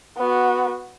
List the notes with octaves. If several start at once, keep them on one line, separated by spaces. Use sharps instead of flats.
B3 F#4